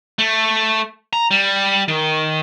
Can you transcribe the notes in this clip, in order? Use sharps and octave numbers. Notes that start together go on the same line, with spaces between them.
A3
A#5
G3
D#3